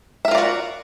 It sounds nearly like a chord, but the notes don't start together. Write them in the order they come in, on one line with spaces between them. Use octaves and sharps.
E5 A#4 F4 D5 F#4